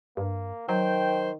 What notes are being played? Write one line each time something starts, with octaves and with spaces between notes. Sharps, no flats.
G2 A#3
D#3 F#3 C5 G5